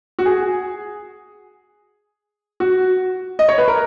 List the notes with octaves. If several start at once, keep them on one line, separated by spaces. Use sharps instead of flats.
F#4
G#4
F#4
D#5
C#5
B4
A#4